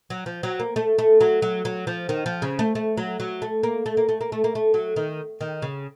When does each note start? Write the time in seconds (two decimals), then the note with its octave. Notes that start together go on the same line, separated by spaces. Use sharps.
0.10 F#3
0.26 F3
0.43 F#3
0.60 A#3
0.76 A3
0.99 A3
1.21 F#3
1.42 F#3
1.65 F#3
1.87 F3
2.09 D#3
2.26 F3
2.42 C#3
2.59 A3
2.75 A3
2.97 F#3
3.20 F#3
3.42 A3
3.63 A#3
3.86 A3
3.97 A#3
4.09 A3
4.21 A#3
4.32 A3
4.44 A#3
4.55 A3
4.74 F#3
4.96 D#3
5.41 D#3
5.62 C#3